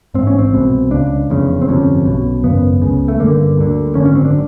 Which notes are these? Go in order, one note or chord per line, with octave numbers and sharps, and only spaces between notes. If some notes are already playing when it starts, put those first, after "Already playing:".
A1 G#2 C4
C#4
C4
C2 B2
C#2 C#3 D4
F1 E2 C#3
C4
G1 F2 C3 C#4
B1 B2
G#1 F#2 C#3 B3
C#2 C#3
A3
G1 G2 D3 A#3
D2 D3
G#1 F#2 D3 C#4
C#4
C4
D4